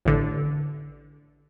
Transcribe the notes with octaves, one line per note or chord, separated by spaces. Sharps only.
A1 D3